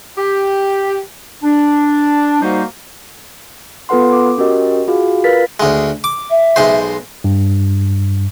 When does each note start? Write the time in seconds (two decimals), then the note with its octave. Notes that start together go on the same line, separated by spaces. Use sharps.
0.18 G4
1.43 D4
2.42 G3 A#3 D#4 F#4 C5
3.89 B3 F4 A4 B4 F#5 C6
4.13 D6
4.38 C#4 F#4 G4 A#4 D#5
4.88 F4 F#4 G#4 F5
5.24 F4 A#4 B4 F5 A6 B6
5.60 D2 G#3
6.04 D6
6.30 E5
6.56 B1 G#3 C5
7.24 G2